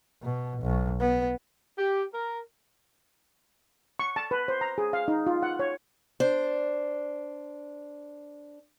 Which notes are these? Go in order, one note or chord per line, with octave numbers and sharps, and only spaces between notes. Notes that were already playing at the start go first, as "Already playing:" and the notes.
B2
B1
B3
G4
A#4
C#6
A5
B4
C5
A#5
G#4
F5
D#4
F4
F#5
C#5
D4 C5